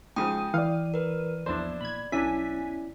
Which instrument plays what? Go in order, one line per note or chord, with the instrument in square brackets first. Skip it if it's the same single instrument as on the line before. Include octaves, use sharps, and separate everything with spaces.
[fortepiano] G#2 C#3 F3 [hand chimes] G5 D#6 [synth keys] D#7
[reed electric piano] E3 D5 [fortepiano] F5
[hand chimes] A#4 B4
[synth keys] A#1 E2 [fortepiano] D4 E4 C5 [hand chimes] D5
[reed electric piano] A#2 [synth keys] B5 G#6
[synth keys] B1 G#5 B6 [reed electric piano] C#4 E4 [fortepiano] D4 E5